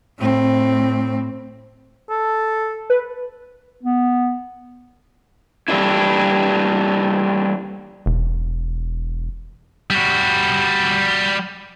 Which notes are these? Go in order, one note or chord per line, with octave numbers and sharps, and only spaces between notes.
A2 C4
A4
B4
B3
E3 G3 A3 A#3 D4 E4
E1
G3 F#4